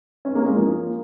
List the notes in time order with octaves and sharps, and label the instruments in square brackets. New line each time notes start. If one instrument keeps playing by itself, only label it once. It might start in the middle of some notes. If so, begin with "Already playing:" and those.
[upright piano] C#4
A#3
G#3
F3 A#3